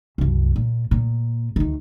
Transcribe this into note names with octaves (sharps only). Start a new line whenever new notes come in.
C2 F#2
A#2
A#2
D2 D#3